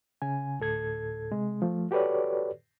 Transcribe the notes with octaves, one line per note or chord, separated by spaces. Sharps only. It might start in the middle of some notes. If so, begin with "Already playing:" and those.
C#3 G#5
D2 A2 A4 G#6
C3 G#3
F3 A3
F#4 G4 A4 B4 C#5 D5